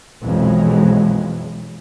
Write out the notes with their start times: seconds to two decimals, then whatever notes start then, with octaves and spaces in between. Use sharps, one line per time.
0.22 B1 F2 E3 F#3 G#3